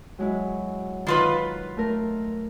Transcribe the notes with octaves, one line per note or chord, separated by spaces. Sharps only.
F#3 G#3 E4
D#3 F4 B4
A3 A#4